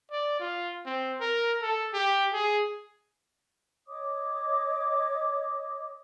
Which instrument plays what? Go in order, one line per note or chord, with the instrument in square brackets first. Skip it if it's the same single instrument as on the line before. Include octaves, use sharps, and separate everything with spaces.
[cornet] D5
F4
C4
A#4
A4
G4
G#4
[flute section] C#5 D#5 D6 D#6